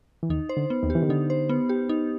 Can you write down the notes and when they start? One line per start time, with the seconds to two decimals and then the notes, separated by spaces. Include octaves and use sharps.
0.23 E3
0.30 D#2 D#3 D#4
0.49 C5
0.57 D3
0.70 B3
0.83 D#2 D#3
0.90 G4
0.95 E3
1.03 D#3
1.10 D3 D#4
1.30 C5
1.49 B3
1.69 G4
1.89 D#4